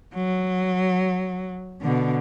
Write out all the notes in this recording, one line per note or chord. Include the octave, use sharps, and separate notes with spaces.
F#3
B2 D3